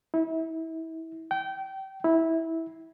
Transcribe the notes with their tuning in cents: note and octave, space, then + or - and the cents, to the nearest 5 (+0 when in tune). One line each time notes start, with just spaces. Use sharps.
E4 -30
G5 -25
E4 -15